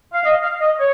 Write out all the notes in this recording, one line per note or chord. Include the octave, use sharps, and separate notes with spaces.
F5
D#5
F5
D#5
C#5